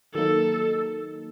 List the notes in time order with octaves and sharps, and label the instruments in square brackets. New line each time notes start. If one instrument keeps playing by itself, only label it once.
[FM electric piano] D#3 F#3 A#3 D#4 [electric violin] A4